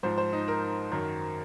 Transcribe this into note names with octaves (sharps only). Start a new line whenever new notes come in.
G#2 F3 C5
C5
D#4
A#4
F#2 D#3 F#3